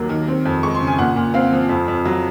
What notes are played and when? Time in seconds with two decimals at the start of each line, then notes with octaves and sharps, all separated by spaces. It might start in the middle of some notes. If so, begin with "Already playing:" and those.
Already playing: D#2 F#3 A#3
0.09 D#3
0.28 C4
0.45 F2
0.63 G#3 C#6
0.75 C6
0.80 C#3
0.87 G#5
0.99 A#2 F#5
1.16 A#2
1.34 C4 F5
1.52 F3
1.69 F2
1.88 F2
2.05 F#3